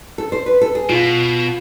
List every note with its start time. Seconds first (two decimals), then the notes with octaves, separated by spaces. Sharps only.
0.18 A4
0.32 C5
0.46 B4
0.61 A4
0.75 G#4
0.89 B2 F4